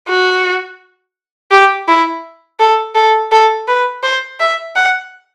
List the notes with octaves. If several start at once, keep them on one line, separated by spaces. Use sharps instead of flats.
F#4
G4
E4
A4
A4
A4
B4
C5
E5
F#5